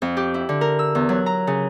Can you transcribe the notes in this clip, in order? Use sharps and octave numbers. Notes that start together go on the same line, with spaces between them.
F2
G4
E4
D3
A#4
E6
E2
F#3
A#5
C#3